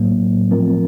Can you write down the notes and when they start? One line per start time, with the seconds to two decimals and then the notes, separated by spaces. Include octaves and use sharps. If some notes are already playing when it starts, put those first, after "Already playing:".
Already playing: A2 F#3 A#3
0.51 F3 A3 C4 F4 A#4